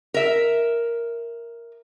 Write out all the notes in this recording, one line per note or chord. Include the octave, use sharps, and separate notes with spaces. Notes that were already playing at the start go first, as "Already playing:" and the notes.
A#4 E5